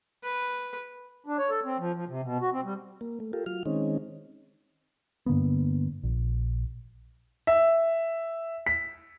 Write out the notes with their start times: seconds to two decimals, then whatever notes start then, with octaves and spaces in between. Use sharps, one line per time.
0.24 B4
1.26 D4
1.38 C#5
1.50 A4
1.65 C4
1.78 F3
1.95 F3
2.08 C3
2.23 B2
2.41 F#4
2.53 C4
2.64 G3
3.01 A#3
3.20 A3
3.33 F4 G4 A4 A#4
3.46 F#3 F4 F6
3.66 D#3 G#3 C4 C#4 D#4
5.26 G2 D3 A#3 B3
6.04 A#1
7.47 E5
8.67 B6